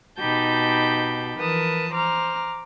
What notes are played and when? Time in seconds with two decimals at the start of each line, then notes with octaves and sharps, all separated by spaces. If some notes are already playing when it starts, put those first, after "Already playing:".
0.19 B2 D#4 G4 A5 B5 G6
1.39 E3 F3 A#4 B4 A5 D#6
1.93 C5 A#5 D6 F6